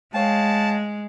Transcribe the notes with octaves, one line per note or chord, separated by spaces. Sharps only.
G#3 C#5 F5 G5 A5